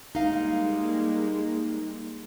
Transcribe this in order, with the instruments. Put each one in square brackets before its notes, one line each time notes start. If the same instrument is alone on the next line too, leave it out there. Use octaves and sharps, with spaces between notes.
[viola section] G3 G#3 A#3 [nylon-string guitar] D#4 F5